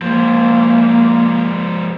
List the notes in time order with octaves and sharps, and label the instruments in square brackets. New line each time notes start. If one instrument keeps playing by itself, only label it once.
[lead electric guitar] F3 G#3 [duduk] A#3